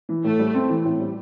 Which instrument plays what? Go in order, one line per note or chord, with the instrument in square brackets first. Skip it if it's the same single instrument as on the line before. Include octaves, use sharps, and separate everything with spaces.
[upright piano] E3
[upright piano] A2 [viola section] A3
[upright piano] G3
C4
E3
A2
G3